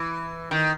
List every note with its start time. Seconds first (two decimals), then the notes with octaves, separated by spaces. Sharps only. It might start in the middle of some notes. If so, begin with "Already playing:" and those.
Already playing: E3
0.51 D#3